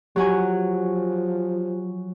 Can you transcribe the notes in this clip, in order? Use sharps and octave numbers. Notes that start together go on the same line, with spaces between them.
F3 F#3 F#4 G4 G#5